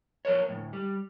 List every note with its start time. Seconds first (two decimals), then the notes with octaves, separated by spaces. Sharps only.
0.25 F3 A#4 B4 C#5
0.49 D2 A2
0.73 G3